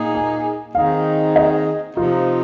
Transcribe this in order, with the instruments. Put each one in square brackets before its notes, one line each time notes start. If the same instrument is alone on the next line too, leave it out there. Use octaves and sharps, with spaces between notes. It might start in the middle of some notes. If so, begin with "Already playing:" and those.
Already playing: [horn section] A#2 A#3 D#4 G#4
[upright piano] G#5
[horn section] D#3 C4 D#4 G#4 [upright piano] F5
[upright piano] D#5
[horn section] C3 F3 C4 D#4 [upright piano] F4